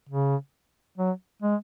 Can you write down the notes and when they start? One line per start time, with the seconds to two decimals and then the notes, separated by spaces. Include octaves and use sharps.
0.09 C#3
0.98 F#3
1.42 G#3